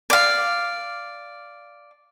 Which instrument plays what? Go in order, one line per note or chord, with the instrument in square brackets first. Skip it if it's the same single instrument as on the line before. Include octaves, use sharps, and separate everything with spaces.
[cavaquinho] D5 F5